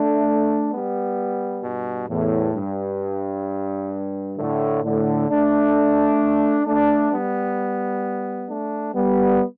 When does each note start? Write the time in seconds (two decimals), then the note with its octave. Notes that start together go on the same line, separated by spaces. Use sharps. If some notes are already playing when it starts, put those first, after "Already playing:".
Already playing: A3 D4
0.72 G3 B3
1.63 G2 B2
2.09 E2 A2
2.55 G2
4.38 A2 D3
4.84 A2 D3
5.29 A3 D4
6.66 A3 D4
7.12 G3 B3
8.49 A3 D4
8.95 G3 B3